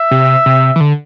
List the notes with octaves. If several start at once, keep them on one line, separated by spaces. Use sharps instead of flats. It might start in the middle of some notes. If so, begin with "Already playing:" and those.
Already playing: E5
C3
C3
E3
D3